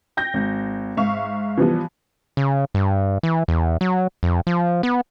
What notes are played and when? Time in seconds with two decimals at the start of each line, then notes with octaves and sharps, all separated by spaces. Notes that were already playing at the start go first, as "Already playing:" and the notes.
0.17 G5 G6 A#6
0.34 G#1
0.97 G#2 E5 F5 C#6
1.58 E3 F3 G3 B3
2.37 C#3
2.74 G2
3.23 E3
3.48 E2
3.81 F#3
4.23 F2
4.47 F3
4.83 B3